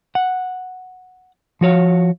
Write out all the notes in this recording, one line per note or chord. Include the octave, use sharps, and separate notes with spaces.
F#5
F3 F#4 C#5 F5